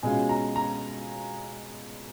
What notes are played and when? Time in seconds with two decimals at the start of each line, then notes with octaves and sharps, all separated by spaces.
0.03 B2 G#3 C#4 F4 G#5
0.29 A#5
0.56 A#5